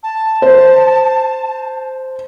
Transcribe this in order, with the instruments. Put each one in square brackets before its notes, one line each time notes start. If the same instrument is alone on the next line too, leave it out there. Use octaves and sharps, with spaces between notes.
[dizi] A5
[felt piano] C5